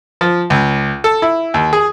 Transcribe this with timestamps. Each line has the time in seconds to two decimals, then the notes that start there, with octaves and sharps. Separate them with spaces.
0.21 F3
0.50 C#2
1.04 A4
1.22 E4
1.54 D#2
1.73 G#4